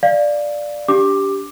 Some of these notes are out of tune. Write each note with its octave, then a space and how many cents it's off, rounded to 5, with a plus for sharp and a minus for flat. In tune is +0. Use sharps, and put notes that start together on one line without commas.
D5 +5 F5 +0
D4 -25 G4 +0 D6 +10